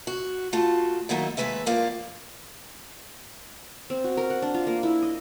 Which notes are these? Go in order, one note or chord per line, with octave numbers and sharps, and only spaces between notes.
F#4
A3 F4 F#4 A5
D#3 F#3 A3 A#3 D#4 E4
D#2 C3 G#3 A3 B4 E5
A2 F3 A#3 D5 F5
C4
F#4
A#4
F#5
D4
F4
A#3
E4
D#5